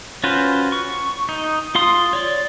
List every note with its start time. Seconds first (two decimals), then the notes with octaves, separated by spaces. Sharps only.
0.24 C#4 F4 F#4 B4 C5
0.72 C#6
1.29 D#4
1.75 F4 F5 C6 D#6
2.13 C#5 D5